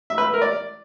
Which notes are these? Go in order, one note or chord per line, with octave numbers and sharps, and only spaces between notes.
E5
B4
E5
A#4
D5